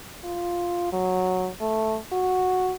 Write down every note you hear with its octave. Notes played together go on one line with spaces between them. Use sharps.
F4
F#3
A3
F#4